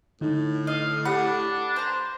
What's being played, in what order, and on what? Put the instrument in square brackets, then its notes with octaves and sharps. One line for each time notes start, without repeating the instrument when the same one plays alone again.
[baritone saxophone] A2 [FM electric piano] D3 D#4
[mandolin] D#5 [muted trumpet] F5
[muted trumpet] D4 [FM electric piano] G4 B5 [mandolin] F#5
[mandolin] C5 A#5